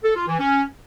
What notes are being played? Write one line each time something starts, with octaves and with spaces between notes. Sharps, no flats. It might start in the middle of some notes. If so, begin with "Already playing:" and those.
A4
F4
E3
C#4